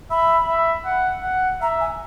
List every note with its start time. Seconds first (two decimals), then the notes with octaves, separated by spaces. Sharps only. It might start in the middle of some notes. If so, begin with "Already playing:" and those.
0.10 E5 B5
0.48 E5
0.85 F#5
1.23 F#5
1.61 E5 A#5
1.81 G#5